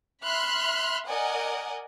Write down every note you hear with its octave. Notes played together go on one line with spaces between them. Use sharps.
E5 B5 C6 F6 F#6
A#4 D5 D#5 F#5 G#5